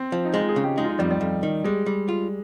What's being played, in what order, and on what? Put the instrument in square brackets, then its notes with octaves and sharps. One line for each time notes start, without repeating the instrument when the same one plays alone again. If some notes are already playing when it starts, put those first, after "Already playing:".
Already playing: [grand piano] C4
[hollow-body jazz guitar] F3
[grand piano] D#4
[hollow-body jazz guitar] G#3 [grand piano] F4
[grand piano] G#4
[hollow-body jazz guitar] C#3
[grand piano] G4
[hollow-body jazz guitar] G#3 [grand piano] D#4
[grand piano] F4
D#4
[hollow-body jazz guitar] F2 [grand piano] G3
[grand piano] G3
[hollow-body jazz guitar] F2
D#3
[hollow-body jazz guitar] G3 [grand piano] G#3
[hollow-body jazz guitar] G3
F4